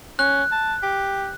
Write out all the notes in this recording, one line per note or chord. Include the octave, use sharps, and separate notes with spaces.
C#4 F#6
A5
G4